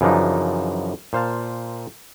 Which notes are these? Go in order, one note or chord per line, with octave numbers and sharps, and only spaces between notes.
F#2 C#3 E3 F3 D4 D#4
A#2 C5 F5 A5